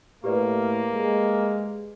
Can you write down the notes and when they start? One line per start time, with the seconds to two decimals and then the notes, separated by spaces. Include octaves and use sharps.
0.24 A2 A#3 G4 B4 D5
0.94 G#3